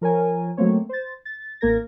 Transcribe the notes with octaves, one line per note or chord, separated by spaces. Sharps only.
F3 A#4 C#5 G#5
F#3 A3 A#3 C4 C#5
C5 A6
A6
A1 A#3 A#4 G#6 A#6